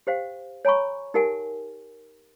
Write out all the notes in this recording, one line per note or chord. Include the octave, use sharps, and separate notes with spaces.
G4 C5 F5 G5
C#5 G#5 A#5 B5 C#6
D#4 G4 A#4 F#5 G#5